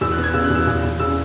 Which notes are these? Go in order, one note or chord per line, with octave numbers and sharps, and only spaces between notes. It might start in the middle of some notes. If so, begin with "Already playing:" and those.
E2 E6
F#6
B3
G#6
C#3 E6
F#6
E2 E6
E2
E2
C#3 E6